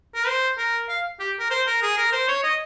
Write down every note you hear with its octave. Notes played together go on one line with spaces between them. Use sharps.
A#4
C5
A#4
F5
G4
A#4
C5
A#4
G#4
A#4
C5
C#5
D#5